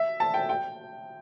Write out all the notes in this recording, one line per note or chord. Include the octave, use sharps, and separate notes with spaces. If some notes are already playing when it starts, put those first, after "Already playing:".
Already playing: E5
A5
G5
G5